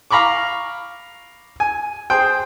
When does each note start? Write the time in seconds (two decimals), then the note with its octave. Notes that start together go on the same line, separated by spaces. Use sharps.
0.11 F5 A#5 B5 C#6 D6
1.60 G#5
2.10 G#4 C5 G5